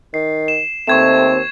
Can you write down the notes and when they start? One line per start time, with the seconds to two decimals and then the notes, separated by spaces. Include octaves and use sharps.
0.14 D#3 C7
0.48 E7
0.87 D#2 A3 C4 C#6 G#6 E7